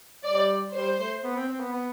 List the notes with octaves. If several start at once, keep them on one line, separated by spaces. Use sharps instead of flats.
G3 D5
G3 C5
A3
B3
C4
C4
B3
B3